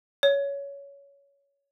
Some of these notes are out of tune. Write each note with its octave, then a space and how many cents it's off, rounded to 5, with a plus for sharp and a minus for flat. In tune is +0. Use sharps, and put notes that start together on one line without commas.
C#5 +15